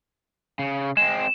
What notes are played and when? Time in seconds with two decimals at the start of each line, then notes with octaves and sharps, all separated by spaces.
0.59 C#3
0.97 G#3 C4 E7